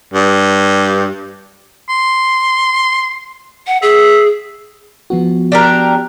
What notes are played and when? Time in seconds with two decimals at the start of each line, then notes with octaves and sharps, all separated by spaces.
0.14 G2
1.89 C6
3.67 F#5
3.82 G#4 E5
5.10 F3 B3 F#4
5.52 D4 G4 A#4